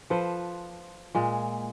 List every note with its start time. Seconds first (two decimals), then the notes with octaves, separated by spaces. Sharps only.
0.10 F3 A4 B4 C5
1.15 A#2 G#3